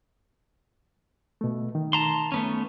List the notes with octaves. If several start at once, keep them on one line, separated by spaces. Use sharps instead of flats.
B2 A3
D#3
A5 A#5 C6
A3 B3 C#4